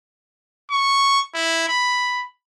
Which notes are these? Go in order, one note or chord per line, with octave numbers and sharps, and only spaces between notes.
C#6
E4
B5